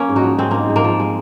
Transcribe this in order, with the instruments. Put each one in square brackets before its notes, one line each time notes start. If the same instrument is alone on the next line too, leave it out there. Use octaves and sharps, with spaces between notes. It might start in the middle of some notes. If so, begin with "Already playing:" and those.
Already playing: [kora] A#3 C#4
G#2
D#4 F#4
F3
G#3 C4
G#2 A#3
G#2
A#3
F3
G#3